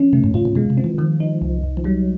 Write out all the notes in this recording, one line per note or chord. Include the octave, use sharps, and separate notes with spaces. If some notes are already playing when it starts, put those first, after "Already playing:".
Already playing: F3 C#4
C3 A3
G#2
A#2 F4
A#2
B2 G#3
C3
C4
E3
D#3 F3
D#4
C2
C2
F3
F#3 G3